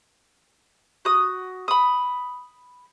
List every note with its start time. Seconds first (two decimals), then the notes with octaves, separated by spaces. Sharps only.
1.05 F#4 D#6
1.68 B5 D#6